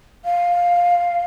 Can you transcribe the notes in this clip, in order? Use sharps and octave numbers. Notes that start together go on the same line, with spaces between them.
F5